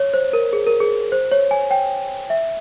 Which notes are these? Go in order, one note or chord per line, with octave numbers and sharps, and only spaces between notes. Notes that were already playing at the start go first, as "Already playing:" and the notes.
Already playing: C#5
C5
A#4
G#4
A#4
G#4
C5
C#5
G#5
G5
E5